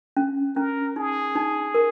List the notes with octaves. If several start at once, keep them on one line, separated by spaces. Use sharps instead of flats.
C#4
C#4 A#4
D#4 G#4
D#4
A#4